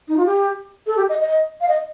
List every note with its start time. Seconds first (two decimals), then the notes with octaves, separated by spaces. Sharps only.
0.08 D#4
0.17 F4
0.26 G4
0.87 A4
0.97 G4
1.09 D#5
1.21 D#5
1.61 F5
1.68 D#5